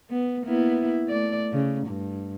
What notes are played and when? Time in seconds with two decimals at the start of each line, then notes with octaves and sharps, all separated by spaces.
0.11 B3
0.43 A#3 B3 E4
1.09 A3 D5
1.52 C#3
1.87 G2